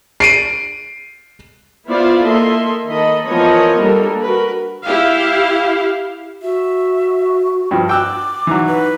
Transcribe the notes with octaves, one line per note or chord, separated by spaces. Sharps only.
C7 D7 D#7
B3 E4 F4 C5 D5 F5
A#3 A4 D#5 E5 C6
D#3 A4 D#5 B5
E3 F3 B3 A#4 C#5 D#5
G3 A#3 D4 A4 A#4
F#4 A#4 B4
E4 G4 F5
F#4 E5
G2 F3
G5 D6 E6 F#6
E3 F#3 D#4
B4